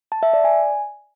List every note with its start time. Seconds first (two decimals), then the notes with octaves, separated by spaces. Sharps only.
0.12 A5
0.23 E5
0.33 D5
0.44 G#5